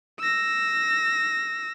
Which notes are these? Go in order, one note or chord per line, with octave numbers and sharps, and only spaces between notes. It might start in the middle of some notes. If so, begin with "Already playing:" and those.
E6 A#6